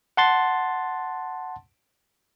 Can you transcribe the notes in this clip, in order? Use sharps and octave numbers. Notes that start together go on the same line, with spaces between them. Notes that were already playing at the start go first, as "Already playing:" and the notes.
F#5 A5 C6 A6